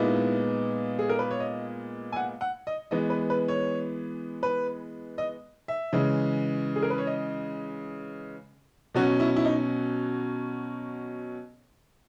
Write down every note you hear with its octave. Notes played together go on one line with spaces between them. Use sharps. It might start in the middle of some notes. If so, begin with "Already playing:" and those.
Already playing: A#2 G#3 B3 D#4 E4
G#4
A#4
B4
C#5
D#5
G#5
F#5
F#5
D#5
E3 G#3 B3 D#5
B4
B4
C#5
B4
D#5
E5
C#3 E3 G#3
G#4
A#4
B4
C#5
D#5
B2 F#3 C#4 F#4
E4
E4
D#4